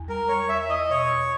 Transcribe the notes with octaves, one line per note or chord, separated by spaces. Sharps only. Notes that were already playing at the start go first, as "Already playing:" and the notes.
Already playing: E2
G3 A#4
G3 C#5
E2 E5
E5
E2 D#5
B2 C#5
E2